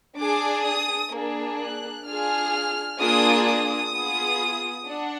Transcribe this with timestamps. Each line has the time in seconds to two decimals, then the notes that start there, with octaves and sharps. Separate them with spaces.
0.17 D4 G#4 D6
0.64 D#6
1.12 A#3 D4 G#4
1.59 F#6
2.06 D4 F4 G#4 F6
3.00 A#3 D4 F4 G#4 D#6
3.47 D#6
3.94 B3 F4 G#4
4.88 D4 F#5